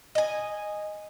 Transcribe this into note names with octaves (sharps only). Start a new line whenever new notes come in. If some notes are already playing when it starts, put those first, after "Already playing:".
D#5 G#5